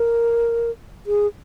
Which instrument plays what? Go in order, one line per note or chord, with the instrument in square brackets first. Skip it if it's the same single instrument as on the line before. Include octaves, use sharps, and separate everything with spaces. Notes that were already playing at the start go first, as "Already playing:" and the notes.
Already playing: [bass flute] A#4
G#4